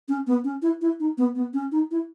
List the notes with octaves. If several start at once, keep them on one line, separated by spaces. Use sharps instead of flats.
C#4
B3
C#4
E4
E4
D#4
B3
B3
C#4
D#4
E4